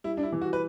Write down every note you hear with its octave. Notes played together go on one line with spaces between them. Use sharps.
G3 E4
D4
E4
E3
F#4
B4